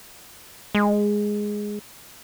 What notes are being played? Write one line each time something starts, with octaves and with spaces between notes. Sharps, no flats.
G#3